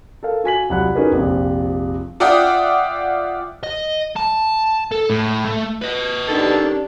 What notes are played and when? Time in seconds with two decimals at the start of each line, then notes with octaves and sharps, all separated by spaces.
0.23 A4 A#4 F5
0.44 F#4 G#5 B6 F#7
0.70 C2 F#3 F4 F#5 B5 F#6
0.95 C#4 D#4 F#4 G#4 A#4 B4
1.12 A#1 F2 C3 F3
2.20 F4 D5 E5 F#5 G5 D#6
3.63 D#5
4.16 A5
4.92 A4
5.10 A2
5.45 A3
5.82 B4 D#5
6.28 D#3 C#4 D4 G4 A4